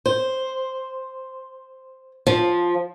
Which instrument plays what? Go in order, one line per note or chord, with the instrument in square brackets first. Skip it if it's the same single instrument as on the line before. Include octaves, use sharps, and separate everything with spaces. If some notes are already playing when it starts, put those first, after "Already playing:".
[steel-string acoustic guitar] C5
F3